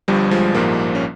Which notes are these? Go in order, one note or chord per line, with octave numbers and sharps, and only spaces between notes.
G1 G2 F3 G3
F3 G#3
A#1 G#2 F3 G3 A#3
C#4